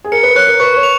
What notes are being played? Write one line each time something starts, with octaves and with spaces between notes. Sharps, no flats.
G#4
A#4 C#7
B4
C#5 F#6
A#4
B4 C#6
C#5
F7